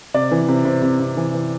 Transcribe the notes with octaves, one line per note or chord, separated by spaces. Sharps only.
C3 D5
E3
C3
C3
C3
C3
E3
E3